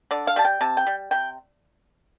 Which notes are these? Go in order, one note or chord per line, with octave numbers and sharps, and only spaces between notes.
D3 D5
F5
G3 A5
G5
C3 A5
G5
G3
C3 G5